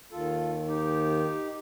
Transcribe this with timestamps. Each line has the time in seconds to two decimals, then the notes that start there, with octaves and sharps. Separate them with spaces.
0.12 D#2 D#3 F4 A4
0.68 D#4 G4